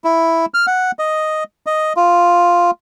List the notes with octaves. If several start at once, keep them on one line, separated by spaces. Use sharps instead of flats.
E4
F6
F#5
D#5
D#5
F4